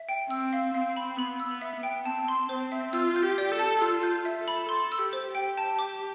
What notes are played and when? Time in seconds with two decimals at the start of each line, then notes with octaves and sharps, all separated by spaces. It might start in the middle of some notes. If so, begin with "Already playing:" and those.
Already playing: E5
0.09 G5
0.30 C4 E6
0.53 F5
0.74 C4 F5
0.97 B5
1.17 B3 B5
1.40 E6
1.47 B3
1.62 E5
1.76 B3
1.83 G5
2.06 C4 A5
2.28 C6
2.49 C4 C5
2.72 E5
2.93 F4 E6
3.16 G6
3.23 G4
3.38 D5
3.52 A4
3.59 A5
3.82 F4 E6
4.03 G6
4.25 E5
4.40 A4
4.48 B5
4.69 A4 C6
4.92 E6
4.99 G4
5.13 C5
5.28 G4
5.35 G5
5.58 A5
5.79 D6